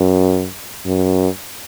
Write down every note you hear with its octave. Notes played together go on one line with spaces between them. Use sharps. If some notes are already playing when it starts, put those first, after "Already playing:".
Already playing: F#2
F#2